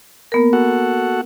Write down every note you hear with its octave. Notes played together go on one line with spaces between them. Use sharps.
A#3 B3 A#4
F#4 A4 F#5